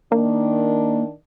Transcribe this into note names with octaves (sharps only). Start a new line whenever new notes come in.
D#3 A#3 D4